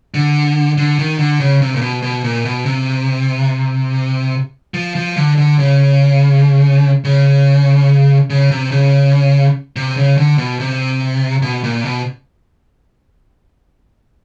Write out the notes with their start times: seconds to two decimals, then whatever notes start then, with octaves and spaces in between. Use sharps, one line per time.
0.14 D3
0.78 D3
0.99 D#3
1.19 D3
1.40 C#3
1.62 C3
1.76 A#2
1.81 B2
2.02 B2
2.24 A#2
2.45 B2
2.66 C3
4.74 F3
4.96 F3
5.17 D3
5.38 D3
5.59 C#3
7.04 C#3
8.30 C#3
8.51 C3
8.71 C#3
9.76 C3
9.97 C#3
10.18 D3
10.38 B2
10.60 C3
11.42 B2
11.64 A#2
11.85 B2